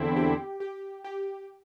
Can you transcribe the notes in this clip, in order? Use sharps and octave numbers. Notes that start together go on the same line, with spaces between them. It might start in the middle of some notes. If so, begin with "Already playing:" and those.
Already playing: E2 D3 C4 E4
G4
G4
G4